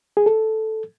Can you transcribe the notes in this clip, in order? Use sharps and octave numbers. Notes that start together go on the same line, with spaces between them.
G#4
A4